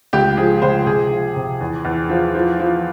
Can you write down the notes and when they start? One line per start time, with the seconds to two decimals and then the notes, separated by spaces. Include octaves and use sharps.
0.13 C#2 G4
0.37 F3 G#4
0.62 C#2 C5
0.86 C3 G#4
1.11 F3
1.36 C3
1.60 E2
1.85 E2
2.10 F3
2.35 F3
2.60 F3